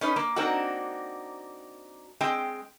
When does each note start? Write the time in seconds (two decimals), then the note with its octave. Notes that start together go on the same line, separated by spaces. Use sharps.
0.01 C#4 D#4 B4
0.16 A#3
0.36 A#3 C4 D4 D#4 F#4
2.21 G#3 C4 G5